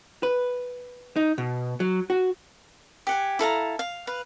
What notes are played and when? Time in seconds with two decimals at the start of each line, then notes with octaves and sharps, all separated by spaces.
0.23 B4
1.16 D#4
1.38 B2
1.80 F#3
2.10 F#4
3.07 G4 F#5 G#5
3.39 E4 A4 F5 A#5
3.79 F5
4.07 B4 F5